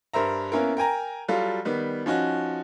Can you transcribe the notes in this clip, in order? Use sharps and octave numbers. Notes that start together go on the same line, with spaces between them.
G2 A#4 C5 E5 A#5
A#3 B3 C#4 E4 A#4
A#4 G5 G#5 A#5
F#3 G3 F4 A4
D#3 G3 B3
F3 C#4 D#4 F#4